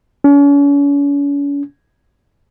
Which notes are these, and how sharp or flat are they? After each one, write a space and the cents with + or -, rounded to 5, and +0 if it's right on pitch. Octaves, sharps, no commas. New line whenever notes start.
C#4 +40